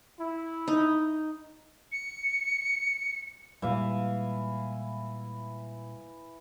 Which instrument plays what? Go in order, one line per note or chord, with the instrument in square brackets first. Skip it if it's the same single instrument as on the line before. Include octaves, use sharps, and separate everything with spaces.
[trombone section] E4
[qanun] D#4
[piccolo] C#7
[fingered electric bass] A#2 G3 G#3 [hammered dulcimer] E3 E5 F5